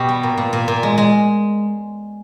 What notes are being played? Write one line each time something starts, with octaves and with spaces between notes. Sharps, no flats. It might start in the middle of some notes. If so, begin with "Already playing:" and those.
Already playing: B2 G4
G3
A#2
A#2
A#2
A#2
G#3
G#3